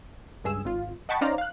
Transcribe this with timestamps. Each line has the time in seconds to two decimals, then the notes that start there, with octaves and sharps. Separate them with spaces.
0.44 C#2 G2 G#4 E6
0.65 G#1 F4
1.09 D#5 F#5 G5 A5 B5 C#6
1.21 C#4 D#4 C5 D5 F5 A#5
1.38 F5 F#6